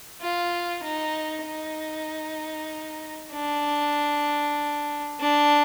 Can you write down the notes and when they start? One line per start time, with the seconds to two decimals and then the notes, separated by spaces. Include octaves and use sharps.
0.21 F4
0.83 D#4
1.45 D#4
3.32 D4
5.21 D4